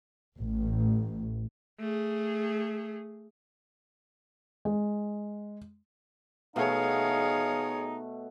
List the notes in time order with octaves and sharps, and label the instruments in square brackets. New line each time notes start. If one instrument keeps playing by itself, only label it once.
[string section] A1
[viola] A3 G#4
[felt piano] G#3
[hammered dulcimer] B2 A3 [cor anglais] D#4 [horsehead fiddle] G#4 C#5 [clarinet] F5